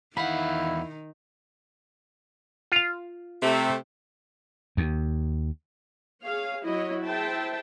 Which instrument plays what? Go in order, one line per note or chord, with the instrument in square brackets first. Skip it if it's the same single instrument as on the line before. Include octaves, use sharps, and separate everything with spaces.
[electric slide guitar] E2 F5 [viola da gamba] D#3 D#4 [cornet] E4 [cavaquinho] F#5 B5
[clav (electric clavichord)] F4 F5
[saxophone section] C3 A3
[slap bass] D#2
[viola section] G#4 C#5 F5
F#3 E4 F#4 C#5 D#5
E4 G#4 C5 E5 G5 A5